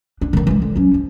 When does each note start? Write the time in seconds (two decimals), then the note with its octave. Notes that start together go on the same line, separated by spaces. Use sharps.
0.21 D4
0.33 D3 D#3
0.47 E3 G#3
0.62 D3
0.76 F#3 C#4
0.94 F3